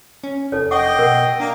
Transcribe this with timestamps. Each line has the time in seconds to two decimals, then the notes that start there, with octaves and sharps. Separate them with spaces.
0.24 C#4
0.52 F1 D#4 A4 C#5
0.71 D#5 F#5 G5 C#6 D6
0.98 B2 A#4 F#5
1.40 A#3 D4